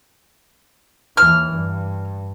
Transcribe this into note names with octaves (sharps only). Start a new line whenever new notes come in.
D#2 E3 F6
G2